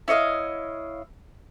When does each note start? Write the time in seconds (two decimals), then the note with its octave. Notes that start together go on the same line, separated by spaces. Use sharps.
0.08 E4 C#5 D#5 F5